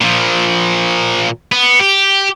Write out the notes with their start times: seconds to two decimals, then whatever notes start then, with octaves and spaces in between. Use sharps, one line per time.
0.01 A#2 F3
1.52 B3
1.80 G4